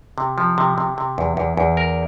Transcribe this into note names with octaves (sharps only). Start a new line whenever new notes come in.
C3
F3
C3
C3
C3
E2
E2
E2
A#4